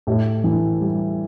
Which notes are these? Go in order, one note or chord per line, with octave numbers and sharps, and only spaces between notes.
A2 G4
E3
G3